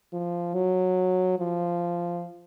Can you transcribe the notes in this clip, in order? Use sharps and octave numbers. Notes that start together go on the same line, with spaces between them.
F3
F#3
F3